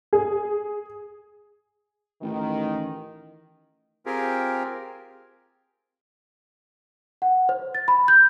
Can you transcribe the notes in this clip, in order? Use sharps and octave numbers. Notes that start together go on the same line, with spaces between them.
G#4
A1 D#3
C4 F4 G4 G#4 A#4
F#5
C5
A6
B5
G6